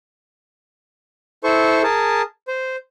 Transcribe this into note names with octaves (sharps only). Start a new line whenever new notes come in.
E4 A4 C5 C#6
G#4 A#4 A5
C5